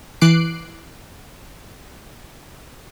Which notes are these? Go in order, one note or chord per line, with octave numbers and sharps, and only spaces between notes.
E3 D6 F#6 C7 D7